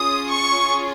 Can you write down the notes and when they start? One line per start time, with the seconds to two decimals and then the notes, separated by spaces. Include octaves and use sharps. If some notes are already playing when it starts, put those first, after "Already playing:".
Already playing: C#4 F4 G#4 D#6
0.31 C#6